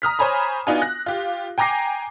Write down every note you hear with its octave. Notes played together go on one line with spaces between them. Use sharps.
A#5 D#6 F6 B6
C5 C#5 G#5 A#5 B5
B3 D4 D#4 F4 F#4 G#5
F#6 A#6
F4 G4
G5 G#5 A#5 D6 A#6 C7